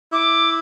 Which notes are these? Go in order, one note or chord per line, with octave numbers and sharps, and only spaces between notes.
E4 D6